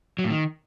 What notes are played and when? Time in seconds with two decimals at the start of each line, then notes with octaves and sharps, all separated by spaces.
0.19 F#3
0.24 A2
0.30 D#3